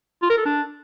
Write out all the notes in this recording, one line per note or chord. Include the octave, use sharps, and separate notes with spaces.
F4
A#4
A4
D4